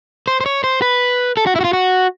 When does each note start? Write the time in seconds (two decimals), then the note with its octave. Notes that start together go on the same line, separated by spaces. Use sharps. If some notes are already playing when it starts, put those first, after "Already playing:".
0.28 C5
0.41 C5
0.46 C#5
0.64 C5
0.82 B4
1.37 A4
1.47 F#4
1.56 E4
1.61 F#4
1.64 F4
1.73 F#4